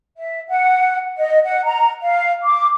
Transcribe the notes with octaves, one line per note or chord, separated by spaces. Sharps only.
E5
F#5
D#5
F#5
A#5
F5
D6